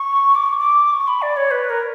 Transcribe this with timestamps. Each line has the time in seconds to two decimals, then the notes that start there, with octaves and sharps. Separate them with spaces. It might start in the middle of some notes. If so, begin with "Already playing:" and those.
Already playing: C#6
0.35 D6
0.46 C#6
0.58 D6
0.93 C#6
1.08 B5
1.22 D5
1.37 C#5
1.51 B4
1.70 A#4